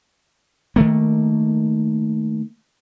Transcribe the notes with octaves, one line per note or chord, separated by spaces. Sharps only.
D#3 A3 A#3